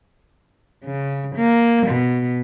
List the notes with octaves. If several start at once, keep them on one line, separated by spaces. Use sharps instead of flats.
C#3
A#3
B2